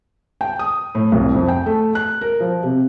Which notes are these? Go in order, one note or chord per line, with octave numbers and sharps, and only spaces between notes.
G5
D#6
A2
C2
F2
G5
A3
F#6
A#4
F3
C3